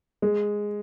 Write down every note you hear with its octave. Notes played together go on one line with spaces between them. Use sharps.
G#3